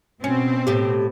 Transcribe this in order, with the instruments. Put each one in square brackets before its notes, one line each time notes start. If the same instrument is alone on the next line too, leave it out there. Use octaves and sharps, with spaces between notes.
[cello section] B2 C4 [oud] C#4
[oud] A2 G4